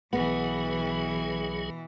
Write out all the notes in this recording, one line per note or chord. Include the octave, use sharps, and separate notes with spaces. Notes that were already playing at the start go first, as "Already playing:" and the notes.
B1 B2 E3 F#3 B3 G#4